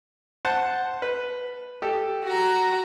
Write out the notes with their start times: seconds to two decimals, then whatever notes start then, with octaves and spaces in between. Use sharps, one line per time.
0.45 C5 F#5 A5
1.02 B4
1.82 G4 A4
2.25 F#4 A#5